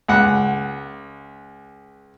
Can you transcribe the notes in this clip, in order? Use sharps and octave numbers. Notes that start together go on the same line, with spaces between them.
C#2 F#5